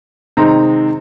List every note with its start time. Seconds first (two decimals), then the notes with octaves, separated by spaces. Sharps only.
0.37 C3 D#3 G#3 C4 D#4 A#5